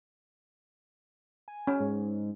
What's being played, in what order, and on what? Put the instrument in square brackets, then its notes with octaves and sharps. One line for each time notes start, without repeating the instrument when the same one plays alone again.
[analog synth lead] G#5
[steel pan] C#4
[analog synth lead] G#2